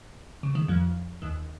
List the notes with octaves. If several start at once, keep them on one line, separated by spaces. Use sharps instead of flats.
C#3
D#3
F2 F3
D#2 D#3